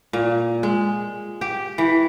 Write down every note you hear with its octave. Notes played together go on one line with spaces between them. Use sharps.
A#2
G#3
G4
E3